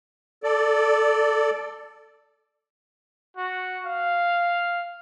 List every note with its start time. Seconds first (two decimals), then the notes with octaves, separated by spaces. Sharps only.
0.43 A4 D5
3.37 F#4
3.85 F5